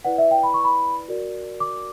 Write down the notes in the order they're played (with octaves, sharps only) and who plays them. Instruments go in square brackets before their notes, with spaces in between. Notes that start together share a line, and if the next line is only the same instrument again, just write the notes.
[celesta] E4 B4 D5 F#5
E5
G5
B5
C#6
B5
F#4 A#4 D5
D6